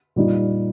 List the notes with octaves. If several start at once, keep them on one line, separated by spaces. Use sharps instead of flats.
A#2 G3 D#4